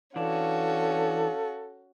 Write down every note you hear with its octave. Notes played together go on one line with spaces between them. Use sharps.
E3 C#4 D4 F#4 A4 F5